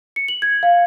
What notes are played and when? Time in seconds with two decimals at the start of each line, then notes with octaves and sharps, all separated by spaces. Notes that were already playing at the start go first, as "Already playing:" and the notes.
0.16 C#7
0.28 F#7
0.42 G#6
0.63 F5